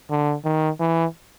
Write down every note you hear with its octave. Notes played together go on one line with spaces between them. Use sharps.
D3
D#3
E3